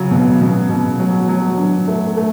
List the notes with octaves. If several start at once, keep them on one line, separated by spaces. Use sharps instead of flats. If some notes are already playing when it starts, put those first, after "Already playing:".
Already playing: C#3 F#3
B2
B2
B2
F#3
F#3
D4
A3
A3